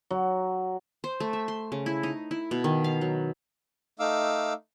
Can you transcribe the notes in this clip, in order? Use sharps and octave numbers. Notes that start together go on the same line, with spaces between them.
F#3
C5
A3
E5
C6
C#3
E4
D#4
E4
B2
D#3
F5
F#3
A3 D#4 F5 D6 E6